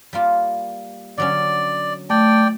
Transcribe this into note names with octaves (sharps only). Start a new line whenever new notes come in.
G3 A#3 F4
D3 F#3 C#4 D5
A3 D5 D#5 G5